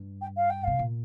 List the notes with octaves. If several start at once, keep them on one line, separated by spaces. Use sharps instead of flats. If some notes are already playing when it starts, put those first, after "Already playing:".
Already playing: G2
G5
F5
G5
C3 F5
A#2